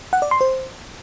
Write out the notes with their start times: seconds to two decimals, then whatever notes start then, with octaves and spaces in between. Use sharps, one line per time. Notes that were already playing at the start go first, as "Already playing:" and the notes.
0.13 F#5
0.22 D5
0.31 C6
0.41 C5